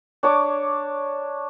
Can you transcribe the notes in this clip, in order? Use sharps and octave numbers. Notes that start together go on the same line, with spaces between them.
D4 C#5 D6